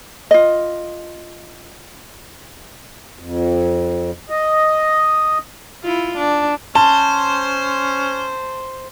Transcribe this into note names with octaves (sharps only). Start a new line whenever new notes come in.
F4 D#5
F2
D#5
E4 F4
D4
C#4 C5 A5